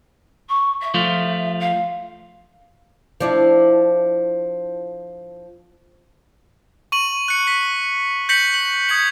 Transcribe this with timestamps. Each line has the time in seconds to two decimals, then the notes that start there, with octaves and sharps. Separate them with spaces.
0.49 C#6
0.81 E5
0.94 F3 A3 F4
1.59 F5
3.20 F3 D4 E4
6.92 C#6 D#7 F#7
7.28 F#6 C#7
7.47 B6
8.29 G6 A#6 B6 C#7 F#7
8.54 F#7
8.89 D#6 G#6 C#7 F#7